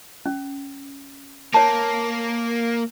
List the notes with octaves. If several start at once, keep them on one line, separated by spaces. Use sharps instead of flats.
C#4
A#3 C#5 A5